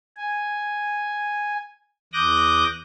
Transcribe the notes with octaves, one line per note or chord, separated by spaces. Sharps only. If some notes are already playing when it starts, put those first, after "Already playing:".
G#5
E2 D6 D#6 F#6 G6 A#6